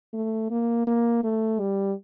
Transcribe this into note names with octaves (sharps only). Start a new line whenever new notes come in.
A3
A#3
A#3
A3
G3